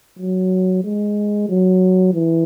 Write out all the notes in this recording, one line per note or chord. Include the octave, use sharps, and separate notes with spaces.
F#3
G#3
F#3
E3